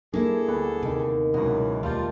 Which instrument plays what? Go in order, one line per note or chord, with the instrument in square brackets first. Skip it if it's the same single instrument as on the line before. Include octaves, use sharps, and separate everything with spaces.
[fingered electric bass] G3 A3 D4 [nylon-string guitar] A#3 E4 [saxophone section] G#4 A4
[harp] D2 B3 B5
[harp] D#2 D7 [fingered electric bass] C3
[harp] C#2 B2 [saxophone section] F#2 E3 [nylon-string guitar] A#4
[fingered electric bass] D#2 [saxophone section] G3 F4 [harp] A3 A#3